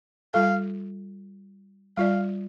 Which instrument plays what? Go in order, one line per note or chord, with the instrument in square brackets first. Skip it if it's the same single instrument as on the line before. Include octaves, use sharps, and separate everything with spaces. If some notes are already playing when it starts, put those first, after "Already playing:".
[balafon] G3 F4 A4 [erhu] F5
[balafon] G3 F4 D5 [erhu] F5